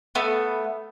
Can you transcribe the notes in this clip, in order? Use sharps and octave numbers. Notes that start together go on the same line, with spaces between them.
A3 B3